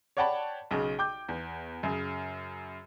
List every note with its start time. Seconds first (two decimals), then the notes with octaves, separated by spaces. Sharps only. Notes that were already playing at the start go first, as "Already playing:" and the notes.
0.17 C#5 D5 F#5 G5 A5 B5
0.71 B1 C#3
0.99 G5 D6 G6
1.29 E2
1.83 F#2 C#3